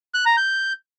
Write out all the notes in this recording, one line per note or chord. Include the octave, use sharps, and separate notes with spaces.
F#6
A#5
G6